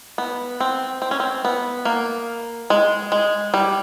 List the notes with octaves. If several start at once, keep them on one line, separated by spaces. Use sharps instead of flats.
B3
C4
C4
C#4
C4
B3
A#3
G#3
G#3
G3